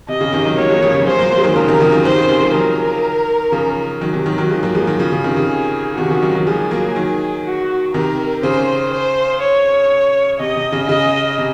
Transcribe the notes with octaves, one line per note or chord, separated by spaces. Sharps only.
C3 D#5
C#3
C3 D#3
D#3 F#3
F#3 A#3 C#5
F3 G#3
C#3 F3
C#3 F3
F#3
F3 G#3 C5
F#3 A#3
F#3 A#3
G#3
D#3 F#3
C#3 F3 A#4
C3 D#3
C#3 F3
D#3 F#3
C3 D#3 C5
C#3
C3 D#3
F3 G#3
D#3 F#3 A#4
C#3 F3
D#3 F#3
C3 D#3
D#3 F#3
D#3 F#3
F3 G#3
F#3 A#3
F3 G#3
D#3 F#3
C#3 F3
C#3
C3 D#3
C#3
G#4
C3 D#3 F#4
C#3 F3
D#3 F#3
D#3 F#3
F3 G#3 G#4
F#3 A#3
D#3 F#3
F#4
C3 D#3 A#4
C#3 C5
C5
C#5
C3 D#5
C3
C#3
C#3 D#5
C3